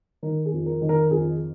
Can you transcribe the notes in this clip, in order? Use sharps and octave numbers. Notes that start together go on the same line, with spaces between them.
D#3 A#4
G#4
F2
A#4
D#3
A#4
F2 G#4